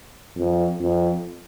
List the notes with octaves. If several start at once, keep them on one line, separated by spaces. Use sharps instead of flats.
F2
F2